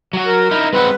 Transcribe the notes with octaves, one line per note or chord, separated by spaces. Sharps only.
F#3 F#4
A#4
D#4 E4
G#3 C4 B4 F#5